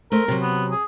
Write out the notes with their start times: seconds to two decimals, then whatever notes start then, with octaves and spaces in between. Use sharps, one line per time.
0.12 A3 A#4 C5
0.28 C3 F#3
0.42 B3
0.71 G#4